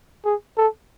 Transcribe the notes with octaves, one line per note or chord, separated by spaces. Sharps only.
G#4
A4